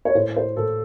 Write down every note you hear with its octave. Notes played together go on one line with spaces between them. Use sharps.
C#5
A2 C5
C5
A2 A4